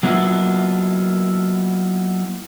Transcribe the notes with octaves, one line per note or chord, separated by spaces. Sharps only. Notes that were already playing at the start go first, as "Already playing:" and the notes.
F#3 A#3 B3 C#4 E4 F4